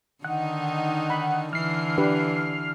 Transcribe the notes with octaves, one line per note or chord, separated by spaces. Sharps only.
D3 D#3 D#4 F#5
B5
D3 E3 F6 C7
D4 G4 B4